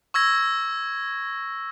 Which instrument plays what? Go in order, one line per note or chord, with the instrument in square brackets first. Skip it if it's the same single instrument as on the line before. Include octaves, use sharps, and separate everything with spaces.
[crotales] C#6 E6 G#6 A#6